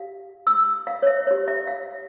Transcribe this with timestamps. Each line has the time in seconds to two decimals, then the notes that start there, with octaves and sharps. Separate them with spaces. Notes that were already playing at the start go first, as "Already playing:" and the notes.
Already playing: G4 F5
0.47 E6
0.87 F5
1.02 C#5
1.07 E5
1.27 G4 C#5
1.48 E5
1.67 F5